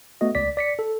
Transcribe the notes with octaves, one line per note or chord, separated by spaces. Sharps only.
A3 B3 F#4 D#5
C#2 D5 B6
D5 B6 C#7
A4